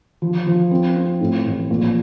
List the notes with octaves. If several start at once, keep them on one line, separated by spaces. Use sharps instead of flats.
F3
F3
C4
C4
A2
A1
A#1